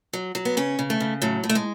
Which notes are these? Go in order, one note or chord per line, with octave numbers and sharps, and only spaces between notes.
F#3
F#3
B3
C#3 C#4
C#3
A3
C#3
A2 F#3
A2
A3
G#3